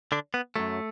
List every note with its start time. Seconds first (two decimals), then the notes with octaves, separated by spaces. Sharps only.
0.12 D3 D4
0.34 B3
0.56 F#2 F#3 A3